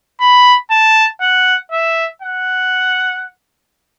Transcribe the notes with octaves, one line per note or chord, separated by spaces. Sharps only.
B5
A5
F#5
E5
F#5